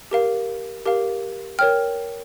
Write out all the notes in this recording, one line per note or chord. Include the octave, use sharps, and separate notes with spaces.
G4 A#4 F5
G4 A#4 F5
A#4 C#5 G5 F6